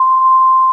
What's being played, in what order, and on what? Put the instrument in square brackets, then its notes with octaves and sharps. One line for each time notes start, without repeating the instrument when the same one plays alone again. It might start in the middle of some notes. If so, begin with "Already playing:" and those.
Already playing: [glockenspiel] C6